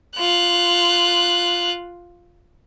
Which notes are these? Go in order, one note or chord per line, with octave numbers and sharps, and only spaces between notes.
F4 F#6